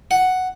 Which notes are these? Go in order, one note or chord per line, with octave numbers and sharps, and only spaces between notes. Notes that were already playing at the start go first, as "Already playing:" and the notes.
F#5